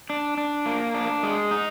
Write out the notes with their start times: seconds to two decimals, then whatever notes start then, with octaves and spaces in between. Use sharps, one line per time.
0.10 D4
0.38 D4
0.66 A#3
0.94 D4
1.23 G#3
1.51 D#4